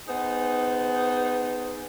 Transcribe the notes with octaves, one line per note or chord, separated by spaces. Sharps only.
B3 D#4 G#4 C5